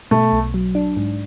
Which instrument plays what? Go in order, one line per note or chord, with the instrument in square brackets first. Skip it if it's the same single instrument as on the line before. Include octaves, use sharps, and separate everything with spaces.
[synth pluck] B2 [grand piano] A3
[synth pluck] B1
F#3
D4
G#2